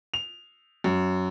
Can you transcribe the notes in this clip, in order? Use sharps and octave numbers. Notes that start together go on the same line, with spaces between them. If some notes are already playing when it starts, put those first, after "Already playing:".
F7
F#2